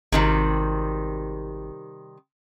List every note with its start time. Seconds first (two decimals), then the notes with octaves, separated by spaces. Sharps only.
0.12 G#1 C3 D#3 G3